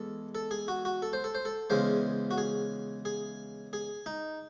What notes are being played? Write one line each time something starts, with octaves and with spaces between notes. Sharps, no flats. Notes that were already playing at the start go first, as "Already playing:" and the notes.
Already playing: E2 G#3 A4
A4
G#4
F#4
F#4
A4
C5
A4
C5
A4
E2 C#3 G#3 C5
F#4
G#4
G#4
G#4
D#4